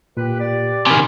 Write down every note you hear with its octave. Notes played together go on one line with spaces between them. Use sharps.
A#2 G4 B4
G4 D5
C3 D#3 G#5 B5